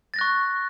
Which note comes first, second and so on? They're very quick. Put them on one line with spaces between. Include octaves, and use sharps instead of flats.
A6 A#6 F#6 C#6